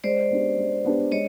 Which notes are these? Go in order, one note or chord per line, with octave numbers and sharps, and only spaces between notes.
G#3 C5 D5
B3 D4 G4
G#3
B3 D4 G4
G#3 C#5 D#5